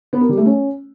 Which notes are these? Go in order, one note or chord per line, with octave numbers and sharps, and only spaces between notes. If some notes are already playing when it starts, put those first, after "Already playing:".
B3
A#4
G3
A3
C#4